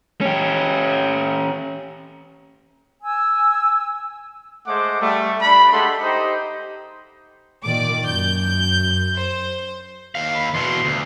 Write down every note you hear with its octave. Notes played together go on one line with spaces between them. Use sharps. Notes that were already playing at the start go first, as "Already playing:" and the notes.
C#4 G4
G#5 E6
G#3 A3 C5 F#5 D6
G3 A3
D4 B5
G#3 A3 G4 A4 F#5 C6
D#4 G4 C5 D#5
A#2 D#3 D5 D6
F#2 G6
C5
D#2 F5
B5
E2 B2 C6
D2